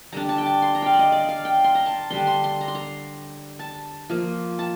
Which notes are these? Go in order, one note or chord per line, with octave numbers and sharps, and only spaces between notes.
D3 G3 D4 A#5
A5
G5
A5
C6
A#5
F5 G5
D5
D#5
D5
F5
G5
C6
A#5
A5
D3 G3 D4 C6
C6
C6
A#5
C6
A#5
A5
F3 A#3 F4
A5